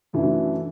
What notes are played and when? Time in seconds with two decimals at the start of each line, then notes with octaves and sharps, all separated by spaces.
0.13 F#2 E3 A3 D4 F#4